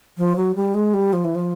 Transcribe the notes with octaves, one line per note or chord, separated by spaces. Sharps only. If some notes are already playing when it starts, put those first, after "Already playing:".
F3
F#3
G3
G#3
G3
F3
E3
F3